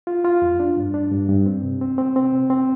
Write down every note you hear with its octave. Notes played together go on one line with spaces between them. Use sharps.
F4
F4
F2
D4
G2
D4
G2
G2
C4
C3
C4
C4
C4
C3
C4